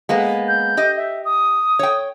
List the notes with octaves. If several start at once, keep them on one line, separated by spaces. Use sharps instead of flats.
G#3 A#3 B3
G6
G4 D#5
E5
D#6
C#5 G5